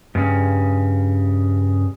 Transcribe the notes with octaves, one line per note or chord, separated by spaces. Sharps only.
G2 C#3